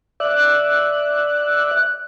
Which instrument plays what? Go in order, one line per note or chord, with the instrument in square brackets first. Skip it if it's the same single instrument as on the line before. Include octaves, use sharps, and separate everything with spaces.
[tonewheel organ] D5 E5 [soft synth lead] F#6